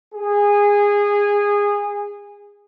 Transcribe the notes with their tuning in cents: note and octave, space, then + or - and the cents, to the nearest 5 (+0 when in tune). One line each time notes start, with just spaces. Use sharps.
G#4 -20